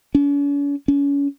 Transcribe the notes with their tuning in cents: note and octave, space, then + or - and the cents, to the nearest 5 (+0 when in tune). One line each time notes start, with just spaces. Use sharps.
C#4 +45
C#4 +30